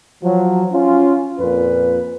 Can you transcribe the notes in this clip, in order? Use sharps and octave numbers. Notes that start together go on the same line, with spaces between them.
F3 F#3
C#4 F4
F2 A#2 B4